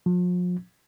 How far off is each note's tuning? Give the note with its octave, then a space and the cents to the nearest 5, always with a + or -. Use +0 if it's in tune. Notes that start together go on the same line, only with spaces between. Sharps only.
F3 +40